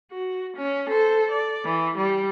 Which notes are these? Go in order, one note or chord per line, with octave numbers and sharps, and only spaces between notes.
F#4
C#4
A4 C5
D5
E3
G3